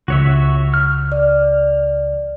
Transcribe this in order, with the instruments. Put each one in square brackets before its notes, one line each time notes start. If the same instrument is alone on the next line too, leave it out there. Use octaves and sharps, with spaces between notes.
[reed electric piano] C#2 [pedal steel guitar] F#4 C#5 E5
[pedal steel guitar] F6
[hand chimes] D5